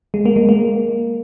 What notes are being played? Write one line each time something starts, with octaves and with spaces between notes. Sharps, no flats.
G#3
A#3
G#3
A#3